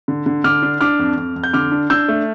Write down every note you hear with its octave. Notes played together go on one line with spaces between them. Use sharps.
D3
D3
D3 D6 F6
D4
D4 D6 F6
F2
F2
F2
G6
D3 D6 F6
D4
D4 E6 G6
A3